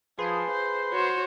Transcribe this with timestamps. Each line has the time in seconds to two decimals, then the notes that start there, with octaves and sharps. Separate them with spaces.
0.19 F3 G#4 B4 C6
0.51 C5
0.93 F#4 C5 C#5